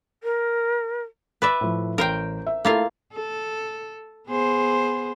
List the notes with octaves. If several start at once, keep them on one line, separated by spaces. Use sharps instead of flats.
A#4
B4 D5 E5
A2 F3
A1 A#4 C5 G5
E5
A3 A#3 E4 F4 A4 F5
A4
B3 G#4 C5